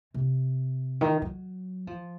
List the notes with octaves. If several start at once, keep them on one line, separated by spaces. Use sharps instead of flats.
C3
D#3
F#3
F3